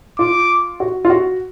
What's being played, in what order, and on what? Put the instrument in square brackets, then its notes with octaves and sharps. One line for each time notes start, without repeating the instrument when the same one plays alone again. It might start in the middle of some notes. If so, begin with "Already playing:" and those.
[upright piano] F4 [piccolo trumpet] D6
[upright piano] F#4
F4
F#4